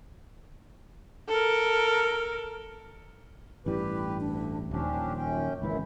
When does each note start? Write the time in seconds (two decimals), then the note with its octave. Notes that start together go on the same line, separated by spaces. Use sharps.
1.28 A4 A#4
3.66 A1 G2 G3 E4 G4 B4
4.20 D2 D4
4.71 D#1 D#2 F3 C#4 D4 G4
5.18 F#2 C#4 G5
5.62 G#1 C#2 F#2 A#2 E3 E4